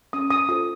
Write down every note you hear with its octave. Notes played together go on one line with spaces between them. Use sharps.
C#4 D#6
D#6
F4 A4 C5 D#6